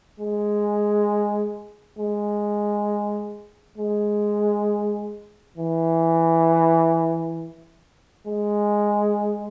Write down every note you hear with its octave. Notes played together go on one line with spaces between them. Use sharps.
G#3
G#3
G#3
E3
G#3